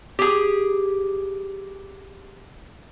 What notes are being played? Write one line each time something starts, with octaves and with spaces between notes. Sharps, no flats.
G4 G#4